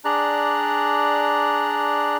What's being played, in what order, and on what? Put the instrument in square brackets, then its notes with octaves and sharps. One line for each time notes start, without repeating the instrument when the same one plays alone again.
[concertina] D4 G#4 D5 A#5 F#6